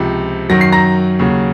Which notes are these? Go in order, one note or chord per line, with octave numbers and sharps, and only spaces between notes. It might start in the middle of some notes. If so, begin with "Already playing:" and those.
Already playing: C#2 C3 F3
F#2 D#3 F#3 A#6
C7
A#5 A#6
D#2 C#3 F#3